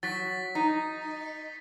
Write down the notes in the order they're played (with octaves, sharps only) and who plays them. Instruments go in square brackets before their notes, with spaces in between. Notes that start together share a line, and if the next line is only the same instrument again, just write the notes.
[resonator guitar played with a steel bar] F#3 [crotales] A6 B6
[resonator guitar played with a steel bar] D#4